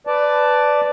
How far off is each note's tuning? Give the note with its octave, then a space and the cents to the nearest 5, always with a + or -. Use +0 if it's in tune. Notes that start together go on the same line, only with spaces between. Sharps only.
B4 +15 D5 +0 A5 +0